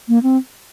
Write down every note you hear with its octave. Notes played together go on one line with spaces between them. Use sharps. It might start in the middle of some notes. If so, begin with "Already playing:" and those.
A#3
C4